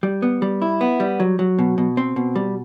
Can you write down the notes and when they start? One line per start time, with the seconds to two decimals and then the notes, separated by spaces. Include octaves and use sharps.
0.03 G3
0.22 B3
0.42 G3
0.62 E4
0.81 B3
1.00 G3
1.20 F#3
1.39 F#3
1.59 B2
1.78 B2
1.97 C4
2.16 B2
2.36 G3